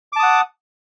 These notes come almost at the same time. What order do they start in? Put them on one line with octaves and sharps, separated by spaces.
D6 A5 D#6 F#5